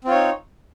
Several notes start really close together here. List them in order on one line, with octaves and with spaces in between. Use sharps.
C4 F4 C#5 D#4